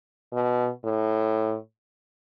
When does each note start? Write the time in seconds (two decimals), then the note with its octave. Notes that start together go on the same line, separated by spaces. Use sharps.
0.33 B2
0.84 A2